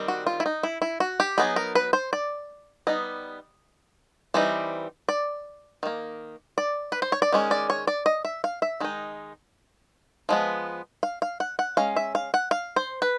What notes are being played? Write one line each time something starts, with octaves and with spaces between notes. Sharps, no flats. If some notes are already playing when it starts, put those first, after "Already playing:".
Already playing: D#3 G3 C4
F#4
F4
E4
D#4
E4
E4
F#4
G4
F#3 B3 D#4 G#4
A#4
B4
C5
D5
G3 B3 D#4 D#5
E3 G3 C4 D#4
D5
D#3 G3 A#3
D5
B4
C5
C#5
D5
D#3 G#3 C#4
D5
C#5
D5
D#5
E5
F5
E5
D#3 G#3 D#4
F3 G#3 B3
F5
F5
F#5
F#5
G#3 C#4 F5
E5
F5
F#5
F5
C5
B4